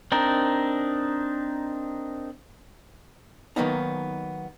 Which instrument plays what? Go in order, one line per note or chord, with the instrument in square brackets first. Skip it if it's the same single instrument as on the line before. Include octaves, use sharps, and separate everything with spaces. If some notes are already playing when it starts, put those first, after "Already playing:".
[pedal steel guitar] C4 D4 D#4 A#4
[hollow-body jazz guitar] D#3 F3 F#3 A#3 B3 D#4